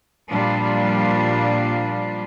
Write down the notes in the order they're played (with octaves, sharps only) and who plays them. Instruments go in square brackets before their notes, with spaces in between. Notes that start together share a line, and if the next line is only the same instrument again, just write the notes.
[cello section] A#2 F3 G3 D4 F4